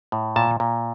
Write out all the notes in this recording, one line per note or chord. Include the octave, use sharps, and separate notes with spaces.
A2
A#2 A5
A#2